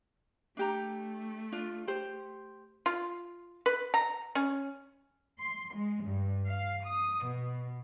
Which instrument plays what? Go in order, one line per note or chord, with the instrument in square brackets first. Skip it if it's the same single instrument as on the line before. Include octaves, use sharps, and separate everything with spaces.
[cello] A3 [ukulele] D4 G4 A#5
[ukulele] D4 F4
G4 C5
[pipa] F4
B4
A#5
C#4
[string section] C6
G#3
G2
F5
D#6
B2